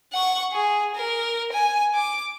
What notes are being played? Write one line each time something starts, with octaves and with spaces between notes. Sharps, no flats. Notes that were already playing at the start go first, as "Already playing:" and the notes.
F#5 C#6
G#4
A#4
G#5
D6